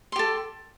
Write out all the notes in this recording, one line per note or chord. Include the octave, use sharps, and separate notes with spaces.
G4 A4 C6